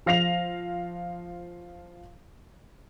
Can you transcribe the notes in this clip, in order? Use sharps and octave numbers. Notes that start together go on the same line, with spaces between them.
F3 F5 A#6 C7 F7